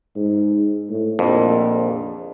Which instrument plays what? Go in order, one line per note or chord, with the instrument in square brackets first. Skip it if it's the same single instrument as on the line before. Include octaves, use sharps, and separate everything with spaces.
[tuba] G#2
A2
[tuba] A#1 [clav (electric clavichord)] F2